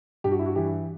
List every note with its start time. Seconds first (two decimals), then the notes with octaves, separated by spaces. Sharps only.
0.24 G2 G4
0.31 F#4
0.39 E4
0.46 F#4
0.56 E3 G4